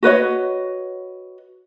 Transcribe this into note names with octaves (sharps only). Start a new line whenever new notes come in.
F#4 B4 C#5 D#5